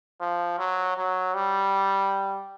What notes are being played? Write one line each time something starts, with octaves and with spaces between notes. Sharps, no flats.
F3
F#3
F#3
G3